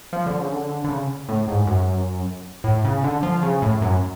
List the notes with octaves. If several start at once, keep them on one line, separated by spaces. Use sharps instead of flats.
F3
D3
C#3
D3
D3
C#3
A2
G#2
F#2
A2
C#3
D3
F3
C#3
A2
F#2